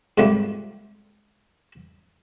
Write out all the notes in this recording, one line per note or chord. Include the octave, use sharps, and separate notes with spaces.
G#2 C3 F3 G3 A3 A#3